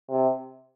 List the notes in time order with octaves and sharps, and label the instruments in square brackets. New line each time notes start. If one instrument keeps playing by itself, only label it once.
[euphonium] C3